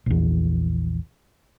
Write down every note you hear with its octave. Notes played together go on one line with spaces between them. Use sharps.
A#1 E2